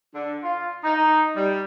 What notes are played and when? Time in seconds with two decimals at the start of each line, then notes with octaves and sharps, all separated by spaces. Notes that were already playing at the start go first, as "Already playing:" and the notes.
0.14 D3
0.43 F4
0.84 D#4
1.35 G3